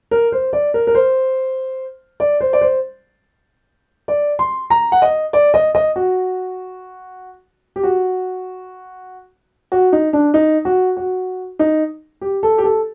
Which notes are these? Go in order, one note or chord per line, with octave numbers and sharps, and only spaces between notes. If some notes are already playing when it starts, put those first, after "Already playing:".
A#4
C5
D5
A#4
A#4
C5
D5
C5
D5
C5
D5
C6
A#5
F#5
D#5
D5
D#5
D#5
F#4
G4
F#4
F#4
D#4
D4
D#4
F#4
F#4
D#4
G4
A4
G4
A4